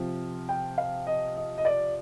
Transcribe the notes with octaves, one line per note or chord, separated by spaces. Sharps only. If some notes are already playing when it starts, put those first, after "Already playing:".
Already playing: C3 F3 C4 F4
G5
F5
D#5
D#5
D#5
D5